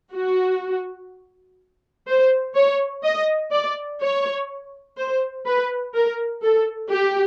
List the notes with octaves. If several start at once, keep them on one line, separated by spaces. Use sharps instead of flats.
F#4
C5
C#5
D#5
D5
C#5
C5
B4
A#4
A4
G4